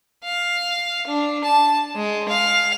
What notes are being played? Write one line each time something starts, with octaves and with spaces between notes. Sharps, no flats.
F5
D4
A5
G#3
F5